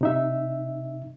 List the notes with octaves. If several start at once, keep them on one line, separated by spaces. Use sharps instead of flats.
C3 D#4 E5